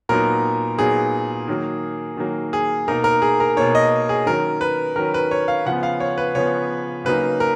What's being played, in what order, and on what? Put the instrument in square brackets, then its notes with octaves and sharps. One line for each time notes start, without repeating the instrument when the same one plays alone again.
[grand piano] A#2 F#3 B3 D#4 A#4
A#2 F#3 B3 D#4 G#4
D#3 F#3 A#3
D#3 F#3 A#3
G#4
B2 A#3 D#4 A#4
A#4
G#4
A#4
B2 A#3 D#4 C#5
D#5
G#4
D#3 F#3 C#4 A#4
B4
D#3 F#3 C#4 A#4
B4
C#5
F5
C#3 F3 B3 F#5
F5
C#5
B4
C#3 F3 B3 C#5
C#3 F#3 A#3 D#4 B4
A#4